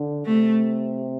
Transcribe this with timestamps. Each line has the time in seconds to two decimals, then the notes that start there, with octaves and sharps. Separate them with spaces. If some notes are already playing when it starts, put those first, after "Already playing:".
Already playing: D3
0.26 C3 A3